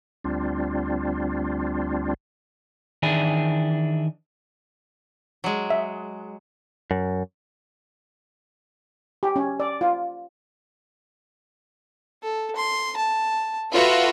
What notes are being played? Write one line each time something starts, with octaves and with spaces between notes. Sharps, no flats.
D2 G3 C4 D4 F4
D#3 E3 D4 E4 G#4
F#3 G#3
E5
F#2
G4
C#4
D5
F4
A4
C6
A5
F4 F#4 A4 B4 E5